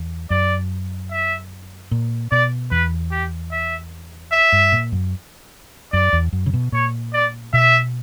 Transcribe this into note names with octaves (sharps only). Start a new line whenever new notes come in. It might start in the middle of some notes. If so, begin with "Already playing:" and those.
Already playing: E2
F#2 D5
E5
A#2
B2 D5
E2 B4
G4
E5
E5
G2
A#2
F#2
F#2 D5
E2
F#2
C#3
B2
A#2 C#5
D5
B2 E5